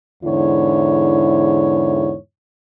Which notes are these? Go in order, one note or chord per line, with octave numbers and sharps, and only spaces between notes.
E2 G#2 D3 E4 C#5